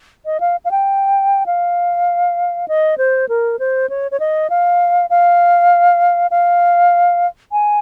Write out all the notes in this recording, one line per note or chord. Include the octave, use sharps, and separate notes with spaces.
D#5
F5
F5
G5
F5
D#5
C5
A#4
C5
C#5
C#5
D#5
F5
F5
F5
G#5